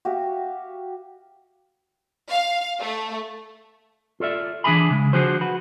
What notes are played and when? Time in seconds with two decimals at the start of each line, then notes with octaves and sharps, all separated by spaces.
0.05 F#4 G4 E5 F5
2.29 F5
2.79 A3
4.20 F4 A4 D5 E5
4.64 E3 D4 G#4 E5 G#5 B5
4.91 C#3 G#3
5.13 D3 F3 F#4 G#4 C5
5.41 F#4 B4